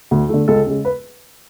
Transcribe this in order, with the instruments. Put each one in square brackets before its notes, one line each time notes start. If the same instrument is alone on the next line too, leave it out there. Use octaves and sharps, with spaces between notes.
[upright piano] D2
D3 A3
C#2 A4
C#3 G#3
B4